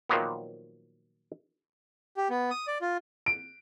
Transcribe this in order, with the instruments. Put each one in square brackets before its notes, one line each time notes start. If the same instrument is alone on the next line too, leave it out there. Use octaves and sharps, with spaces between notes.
[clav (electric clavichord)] A#2 D#3 F3 F#3 A#3 B3
[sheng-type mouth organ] G4
B3
D#6
D5
F4
[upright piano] D7